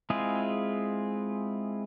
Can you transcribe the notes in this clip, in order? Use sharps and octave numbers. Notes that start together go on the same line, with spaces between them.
G#3 C4 E4 F4 G#4